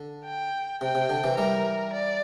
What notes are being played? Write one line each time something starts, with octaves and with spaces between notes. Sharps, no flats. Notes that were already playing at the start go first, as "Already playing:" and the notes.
Already playing: D3
G5
C3 G5
C3
D3
C3 E3
E3 G3 A#4
D5